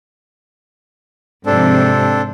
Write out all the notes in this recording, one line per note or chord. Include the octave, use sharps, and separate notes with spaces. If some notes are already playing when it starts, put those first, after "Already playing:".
G#2 C3 F3 C4 D4 A4